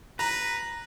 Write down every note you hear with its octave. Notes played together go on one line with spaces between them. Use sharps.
B4 A#5 A#6